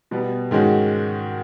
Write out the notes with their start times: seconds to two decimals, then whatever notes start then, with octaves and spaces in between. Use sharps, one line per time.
0.11 B2 G3 B3
0.51 G#2 D#3 G#3 C#4 F#4